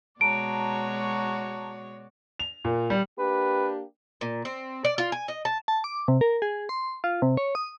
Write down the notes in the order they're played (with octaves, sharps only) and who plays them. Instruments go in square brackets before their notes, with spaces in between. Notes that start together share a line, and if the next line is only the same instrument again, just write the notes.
[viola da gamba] B2 G#3 C#5 [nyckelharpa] F#4 D5 [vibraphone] A5 A#5 [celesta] D7
[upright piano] F7
A#2
G3
[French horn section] A#3 D4 G4 [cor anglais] B4
[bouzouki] A#2
C4
D5
F4
G#5
D#5
A5
[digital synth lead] A5
D6
C3
A#4
G#4
C6
F4
C3
C#5
D#6